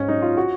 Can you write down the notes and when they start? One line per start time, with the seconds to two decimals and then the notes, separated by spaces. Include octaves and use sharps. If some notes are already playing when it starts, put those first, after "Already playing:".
Already playing: G#2 C#4
0.08 F#3 D#4
0.22 F4
0.37 F#4